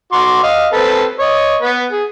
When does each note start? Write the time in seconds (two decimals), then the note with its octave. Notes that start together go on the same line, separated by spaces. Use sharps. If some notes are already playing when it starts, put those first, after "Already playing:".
0.12 F#4 C6 D6
0.43 D#5 F5
0.73 C4 A4 B4
1.19 C#5 D#5
1.62 B3 B4
1.91 G#4